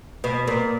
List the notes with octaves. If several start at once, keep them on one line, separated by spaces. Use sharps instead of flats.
B2
A#2